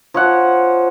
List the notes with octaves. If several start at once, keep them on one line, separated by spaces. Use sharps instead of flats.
F3 C#5 F#5